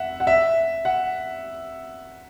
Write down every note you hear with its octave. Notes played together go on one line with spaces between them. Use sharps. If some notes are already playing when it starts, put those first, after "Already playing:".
Already playing: E5 F#5
F#5
E5
F#5